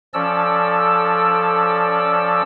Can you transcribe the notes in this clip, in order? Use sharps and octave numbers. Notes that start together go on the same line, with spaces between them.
F3 C#4 A4 D5 E6